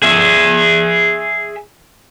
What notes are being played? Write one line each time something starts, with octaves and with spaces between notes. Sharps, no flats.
G#4 E5